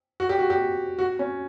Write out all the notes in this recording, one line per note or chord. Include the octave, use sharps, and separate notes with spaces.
F#4
G4
F#4
G4
F#4
C#4